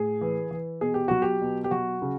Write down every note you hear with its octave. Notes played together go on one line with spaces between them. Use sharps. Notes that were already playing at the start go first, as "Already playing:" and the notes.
Already playing: A2 G#4
E3
E3
B2 G#4
G4
F#3 F#4
G4
B2
G4
F#3 F#4
C#3